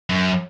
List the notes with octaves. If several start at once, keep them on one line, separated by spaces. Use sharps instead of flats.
F#2